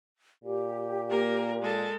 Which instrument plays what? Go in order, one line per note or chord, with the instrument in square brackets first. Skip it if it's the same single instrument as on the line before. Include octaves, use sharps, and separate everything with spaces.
[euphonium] A#2 [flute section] G4
[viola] A#3 A#4
G#3 A4